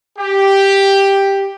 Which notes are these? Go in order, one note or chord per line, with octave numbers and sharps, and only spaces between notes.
G4